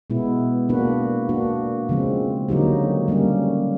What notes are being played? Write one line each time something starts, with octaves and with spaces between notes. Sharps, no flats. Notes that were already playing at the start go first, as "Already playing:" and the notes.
B2 G#3 B3 E4
A#3 D4 F#4 B4
A#3 D4 F#4
C#3 F3 G#3 C4
D3 F#3 A#3 D#4 G4
G3 A#3 C#4